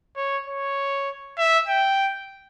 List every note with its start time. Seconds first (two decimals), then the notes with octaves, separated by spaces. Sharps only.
0.16 C#5
0.47 C#5
1.38 E5
1.67 G5